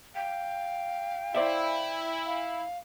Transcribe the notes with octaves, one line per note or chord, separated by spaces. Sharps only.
F5 G5
E4 C5 D5 E5
F5